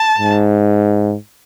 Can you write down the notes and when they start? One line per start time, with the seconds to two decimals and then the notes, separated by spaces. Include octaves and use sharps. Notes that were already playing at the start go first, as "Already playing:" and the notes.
Already playing: A5
0.18 G#2